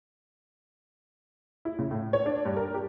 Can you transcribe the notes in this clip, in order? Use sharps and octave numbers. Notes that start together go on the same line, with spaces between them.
E4
C#3
A2
C#5
D4
G2
A#4
G4